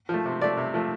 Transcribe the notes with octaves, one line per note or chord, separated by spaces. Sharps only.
F3 A3
C3
F3 A3 D5
C3
F3 A3